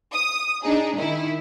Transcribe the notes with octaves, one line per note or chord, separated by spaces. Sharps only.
D#6
D4 D#4 G#4
D#3 E4